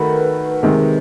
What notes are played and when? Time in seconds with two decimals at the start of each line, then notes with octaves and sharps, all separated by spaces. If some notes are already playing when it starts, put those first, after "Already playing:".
Already playing: D#3 A3 F#4 A#4 B4
0.63 C3 D#3 G#3